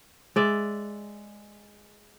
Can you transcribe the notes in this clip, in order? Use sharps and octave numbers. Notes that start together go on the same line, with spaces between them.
G#3 D5 E5